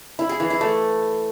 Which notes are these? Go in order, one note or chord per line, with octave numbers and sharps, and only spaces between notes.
E4
G#4
E3
E4
A3